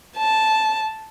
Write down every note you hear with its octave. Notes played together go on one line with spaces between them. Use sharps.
A5